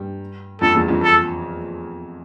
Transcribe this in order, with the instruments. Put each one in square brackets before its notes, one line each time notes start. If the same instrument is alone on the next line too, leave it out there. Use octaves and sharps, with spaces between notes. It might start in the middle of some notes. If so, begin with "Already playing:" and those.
Already playing: [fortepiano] G2
[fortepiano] F2 [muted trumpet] A4
[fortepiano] E2
F2
[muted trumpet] A4